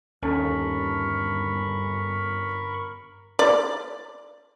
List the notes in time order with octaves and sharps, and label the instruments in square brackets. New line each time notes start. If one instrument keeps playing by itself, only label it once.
[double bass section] G1 [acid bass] D#2 [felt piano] C#4 A4 A5 [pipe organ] A#4 B5 C#6
[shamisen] D5